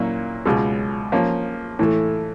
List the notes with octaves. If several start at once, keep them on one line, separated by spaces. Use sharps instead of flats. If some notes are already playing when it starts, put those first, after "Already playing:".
Already playing: A#2 F#3 A#3 C#4 E4
C#2 B2 G#3
F3 A#3 C#4
A2 E3 A3